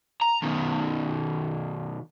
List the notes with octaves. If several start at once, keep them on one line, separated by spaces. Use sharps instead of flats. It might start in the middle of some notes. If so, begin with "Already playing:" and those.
A#5
B2 D#3